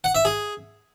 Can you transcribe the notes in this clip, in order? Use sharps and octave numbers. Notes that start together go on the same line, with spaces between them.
F#5
E5
G#4